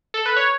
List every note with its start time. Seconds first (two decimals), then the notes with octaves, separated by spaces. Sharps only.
0.14 A4
0.26 B4
0.37 C#5